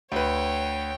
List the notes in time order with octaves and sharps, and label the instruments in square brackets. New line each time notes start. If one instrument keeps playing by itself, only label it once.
[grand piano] D2 B4 [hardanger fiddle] C#5 G5